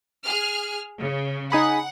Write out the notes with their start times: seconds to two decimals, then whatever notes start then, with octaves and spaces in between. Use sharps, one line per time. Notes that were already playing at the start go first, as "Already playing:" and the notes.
0.24 G#4 F6
0.99 C#3
1.52 D#4 G#4 F#5 B5